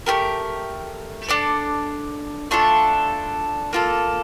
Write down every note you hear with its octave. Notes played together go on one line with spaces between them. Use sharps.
A3 C4 G4 A#4
D4 A4 D5
A3 D4 F4 A4
A#3 F4 A4